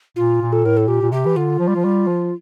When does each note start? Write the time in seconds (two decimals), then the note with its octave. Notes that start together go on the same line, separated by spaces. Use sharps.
0.16 A#2 F4
0.41 A#2
0.53 A4
0.65 A2 A#4
0.77 A4
0.88 A#2 G4
1.02 A#2
1.12 C3 G4
1.26 E3
1.36 D3 F4
1.59 F3
1.68 G3
1.76 F3
1.84 G3
2.07 F3